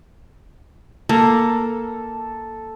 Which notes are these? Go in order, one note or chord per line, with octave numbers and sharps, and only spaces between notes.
A#3 A4